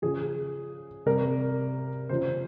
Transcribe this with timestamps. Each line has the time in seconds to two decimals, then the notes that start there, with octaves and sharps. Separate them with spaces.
0.02 C#3 F3 G#4
1.06 C3 G3 A#4
2.09 C#3 F3 C5